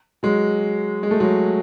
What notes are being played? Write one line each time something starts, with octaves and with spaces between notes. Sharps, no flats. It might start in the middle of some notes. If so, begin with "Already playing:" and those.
F#3 G#3
G#3
A3
F#3 G#3